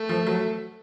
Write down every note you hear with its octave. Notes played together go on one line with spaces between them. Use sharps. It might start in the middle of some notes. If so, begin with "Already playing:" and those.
Already playing: A3
F3
F#3